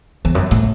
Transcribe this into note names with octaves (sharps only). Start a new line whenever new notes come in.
E2
F#2
A2